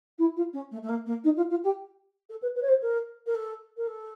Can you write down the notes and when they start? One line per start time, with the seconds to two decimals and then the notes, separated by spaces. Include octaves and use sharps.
0.18 E4
0.36 F4
0.53 C#4
0.71 A3
0.82 A3
0.88 A#3
1.05 A#3
1.23 D#4
1.36 F4
1.49 F4
1.63 G4
2.29 A4
2.42 B4
2.55 B4
2.62 C#5
2.68 C5
2.81 A#4
3.26 A#4
3.34 A4
3.76 A#4
3.87 A4